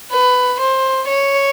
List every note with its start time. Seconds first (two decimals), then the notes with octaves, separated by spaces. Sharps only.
0.11 B4
0.59 C5
1.08 C#5